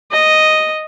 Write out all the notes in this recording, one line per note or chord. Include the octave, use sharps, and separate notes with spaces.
D#5